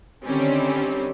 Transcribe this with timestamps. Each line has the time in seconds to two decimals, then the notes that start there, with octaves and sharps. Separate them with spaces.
0.24 D3 D#3 G3 C4 C#4